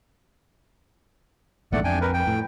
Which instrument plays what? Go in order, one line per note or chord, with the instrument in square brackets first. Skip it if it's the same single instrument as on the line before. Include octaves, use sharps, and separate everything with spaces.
[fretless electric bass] A#1 E2 G#2 [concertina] A3 D5 F#5
[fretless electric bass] F2 [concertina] D4 G5 G#5
[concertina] A#4 B4
G5
[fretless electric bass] A2